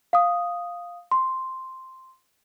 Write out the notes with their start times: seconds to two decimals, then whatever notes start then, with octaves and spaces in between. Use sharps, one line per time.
0.13 F5 D#6
1.11 C6